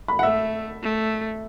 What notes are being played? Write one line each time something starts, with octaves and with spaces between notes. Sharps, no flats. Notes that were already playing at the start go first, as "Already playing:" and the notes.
B5
F#5
A3 E5
A3